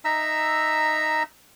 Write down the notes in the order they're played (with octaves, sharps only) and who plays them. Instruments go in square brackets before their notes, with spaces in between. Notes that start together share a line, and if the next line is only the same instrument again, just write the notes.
[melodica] D#4 E5 A#5 E6